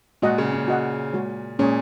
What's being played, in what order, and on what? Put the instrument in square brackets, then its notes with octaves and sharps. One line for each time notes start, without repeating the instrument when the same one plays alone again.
[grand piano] A#2 [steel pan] G#3 F#4 D#5 F#5
[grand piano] C#3
A#2
[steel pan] F#4 D#5 F#5
G#3 F#4 C#5
[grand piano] A#2 [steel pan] G#3 C#4 G#4 C#5